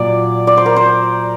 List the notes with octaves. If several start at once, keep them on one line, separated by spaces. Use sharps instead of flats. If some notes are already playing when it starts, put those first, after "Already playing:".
Already playing: A#2 F#3 D5
D5
C5
A#4
C5